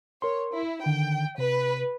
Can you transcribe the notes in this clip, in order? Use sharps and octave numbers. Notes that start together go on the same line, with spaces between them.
A#4 C#5 C6
E4
D3 D#3 G5
C3 B4